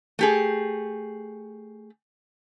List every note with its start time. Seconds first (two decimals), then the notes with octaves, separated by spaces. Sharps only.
0.19 A3 G4 G#4